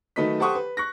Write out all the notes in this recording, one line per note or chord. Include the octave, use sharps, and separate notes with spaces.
D#3 F#3 A3 B4 D#5 B6
G4 A4 C5 F#5 C#6 D#6
B4
C#6 F#6 A#6